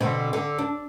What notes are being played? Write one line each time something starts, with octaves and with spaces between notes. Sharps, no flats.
B2 D3 C4
D3
D4